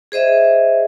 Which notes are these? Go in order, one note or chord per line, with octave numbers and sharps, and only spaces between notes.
G#4 C5 D#5 E5